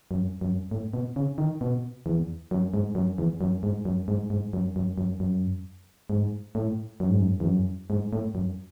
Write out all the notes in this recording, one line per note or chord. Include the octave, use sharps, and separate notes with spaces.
F#2
F#2
A2
B2
C#3
D#3
B2
E2
F#2
G#2
F#2
E2
F#2
G#2
F#2
G#2
G#2
F#2
F#2
F#2
F#2
G#2
A2
F#2
G#2
F#2
E2
F#2
G#2
A2
F#2